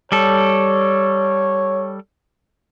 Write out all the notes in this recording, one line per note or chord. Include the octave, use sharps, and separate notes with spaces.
G3 A4 C#5